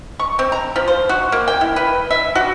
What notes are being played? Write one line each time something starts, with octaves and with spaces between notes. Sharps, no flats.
C#6
C4
A#5
F3
C5
F#4
A#3
G5
E4
B4
E5
F#4